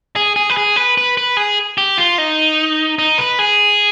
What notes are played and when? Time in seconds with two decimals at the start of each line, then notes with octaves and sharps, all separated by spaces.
0.16 G#4
0.36 G#4
0.50 B4
0.57 G#4
0.76 B4
0.98 B4
1.17 B4
1.37 G#4
1.78 G4
1.98 F4
2.18 D#4
2.99 D#4
3.18 B4
3.39 G#4